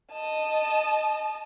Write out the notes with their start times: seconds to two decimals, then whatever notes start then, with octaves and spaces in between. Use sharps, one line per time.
0.12 D#5 A5